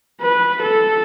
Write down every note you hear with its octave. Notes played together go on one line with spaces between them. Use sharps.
B4
A4